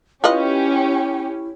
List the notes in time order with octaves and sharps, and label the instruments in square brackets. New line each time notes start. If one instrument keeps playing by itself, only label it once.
[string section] C#4 G4 [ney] E4 [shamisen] F4 B4 D#5